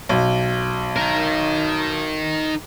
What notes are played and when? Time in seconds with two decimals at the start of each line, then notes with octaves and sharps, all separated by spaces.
0.09 B1
0.96 D#4 A#4